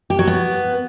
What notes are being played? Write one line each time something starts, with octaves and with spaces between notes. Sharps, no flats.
G4
F#3
B3